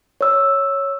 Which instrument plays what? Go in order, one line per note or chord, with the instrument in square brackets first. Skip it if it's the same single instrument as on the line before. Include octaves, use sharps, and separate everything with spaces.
[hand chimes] C#5 E6